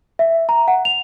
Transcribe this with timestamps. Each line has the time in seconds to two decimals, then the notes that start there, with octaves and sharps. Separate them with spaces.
0.19 E5
0.49 A#5
0.68 F#5
0.85 F7